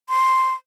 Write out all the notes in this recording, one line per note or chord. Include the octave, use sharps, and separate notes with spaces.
C6